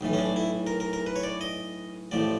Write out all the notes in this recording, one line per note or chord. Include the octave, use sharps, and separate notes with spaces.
B1 A2 E3
C#4
D4
E4
A#4
A#4
A#4
B4
C#5
D5
D#5
A1 A2 F3 D5